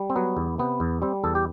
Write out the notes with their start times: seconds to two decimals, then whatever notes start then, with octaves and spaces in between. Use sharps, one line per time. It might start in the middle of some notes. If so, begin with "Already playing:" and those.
Already playing: G3
0.10 C4
0.16 F#3 B3
0.37 E2
0.58 C3 B3
0.80 E2
1.02 G3 C4
1.24 E2 A4
1.35 G4